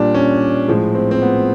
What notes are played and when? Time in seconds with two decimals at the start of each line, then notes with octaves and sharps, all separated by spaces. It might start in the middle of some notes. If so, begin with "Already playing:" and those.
Already playing: A#2 G3 D4
0.14 C#4
0.68 A2 F3 G#3
0.95 C4
1.11 C4
1.22 B3